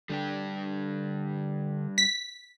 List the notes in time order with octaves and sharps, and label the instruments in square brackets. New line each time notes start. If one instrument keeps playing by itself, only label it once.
[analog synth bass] D3 [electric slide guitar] G3 D4 G4
[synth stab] B6